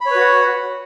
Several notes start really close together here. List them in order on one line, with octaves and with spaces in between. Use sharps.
B5 C#5 B4 F#4 F#5